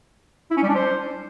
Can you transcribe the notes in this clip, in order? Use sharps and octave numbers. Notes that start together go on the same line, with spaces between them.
E4
C#4
G3
D4
C5